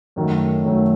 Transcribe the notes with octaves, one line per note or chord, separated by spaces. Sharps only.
F#2 D#3 F#3 A3
F#2 D#3 F#3 A3